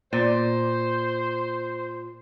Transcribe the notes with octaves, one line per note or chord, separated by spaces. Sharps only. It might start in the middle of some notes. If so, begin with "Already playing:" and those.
A#2 C5